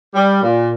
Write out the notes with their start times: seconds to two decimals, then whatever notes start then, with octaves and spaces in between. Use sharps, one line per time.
0.14 G3
0.42 A#2